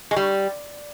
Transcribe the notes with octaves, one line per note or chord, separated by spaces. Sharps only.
G#3
G3